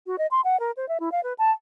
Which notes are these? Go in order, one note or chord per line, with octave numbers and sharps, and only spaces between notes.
F#4
D#5
C6
F#5
A#4
C5
E5
E4
F5
B4
A5